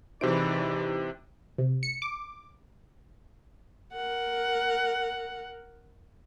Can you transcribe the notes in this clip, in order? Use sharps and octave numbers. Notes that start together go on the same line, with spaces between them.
C3 E3 D#4 G4 G#4 C5 D5 D7
C3
C#7
D6
A#4 F#5